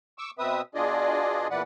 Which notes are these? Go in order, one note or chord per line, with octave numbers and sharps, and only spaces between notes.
C#6 D6 E6
B2 C4 B4 E5 D#6
B2 D4 F4 G#4 D5 D#5
E2 A#2 E3 B4 D5 F#5